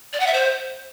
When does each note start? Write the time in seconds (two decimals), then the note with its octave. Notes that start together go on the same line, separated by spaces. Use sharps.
0.13 D5
0.20 F#5
0.27 E5
0.34 C5